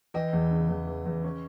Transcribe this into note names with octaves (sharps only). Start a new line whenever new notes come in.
E3 D#5 G5
E2
C#3
E2
E3
E2
C#4